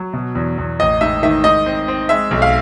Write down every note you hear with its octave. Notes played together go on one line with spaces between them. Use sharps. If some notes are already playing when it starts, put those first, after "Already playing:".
Already playing: F#3
B2
E2
E2
A1 D#5
G#2 E5
D#3 E5
G#2 D#5
C4
C4
G#3 E5
B1
F5